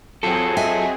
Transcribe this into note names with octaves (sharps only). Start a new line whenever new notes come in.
F#3 C4 F4 G#4 A4
D#5 E5 G#5